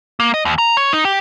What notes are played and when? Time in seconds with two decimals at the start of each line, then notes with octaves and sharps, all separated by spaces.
0.20 A#3
0.34 D#5
0.45 D#2
0.58 A#5
0.77 C#5
0.93 D#4
1.05 G4